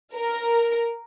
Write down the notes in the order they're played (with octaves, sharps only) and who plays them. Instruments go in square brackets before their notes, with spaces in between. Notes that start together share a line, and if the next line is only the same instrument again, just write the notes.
[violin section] A#4